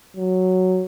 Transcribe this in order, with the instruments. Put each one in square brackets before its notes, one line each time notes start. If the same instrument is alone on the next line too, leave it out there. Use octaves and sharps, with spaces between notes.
[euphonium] F#3